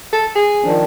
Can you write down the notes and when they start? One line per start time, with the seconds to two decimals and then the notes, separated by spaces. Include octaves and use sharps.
0.13 A4
0.36 G#4
0.64 D#3 F3 D4